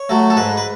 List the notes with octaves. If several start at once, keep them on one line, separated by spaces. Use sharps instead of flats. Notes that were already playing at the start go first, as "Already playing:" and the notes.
Already playing: C#5
F#3 A3
A4
G#2 B4
B4